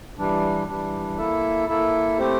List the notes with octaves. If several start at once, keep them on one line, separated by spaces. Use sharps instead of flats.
E3 G3 D4
E3 G3 D4
A#3 E4 A4 E5
A#3 E4 A4 E5
A3 C4 G4 C5